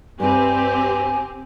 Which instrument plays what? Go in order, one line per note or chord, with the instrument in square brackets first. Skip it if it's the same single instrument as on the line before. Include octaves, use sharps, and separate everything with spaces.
[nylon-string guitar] G2 B4 [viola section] C4 G4 [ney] G#5